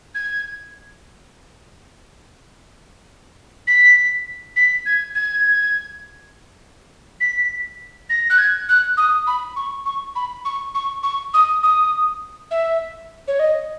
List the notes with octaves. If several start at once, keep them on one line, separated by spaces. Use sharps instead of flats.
G#6
B6
B6
G#6
G#6
B6
A#6
F#6
G#6
F#6
D#6
B5
C#6
C#6
B5
C#6
C#6
C#6
D#6
D#6
E5
C#5
D#5